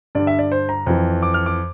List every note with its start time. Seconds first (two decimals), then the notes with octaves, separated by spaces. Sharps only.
0.15 G2 D3 D5
0.27 E5
0.39 D5
0.52 C5
0.69 A#5
0.86 F2 E3
1.23 D6
1.34 F6
1.46 D6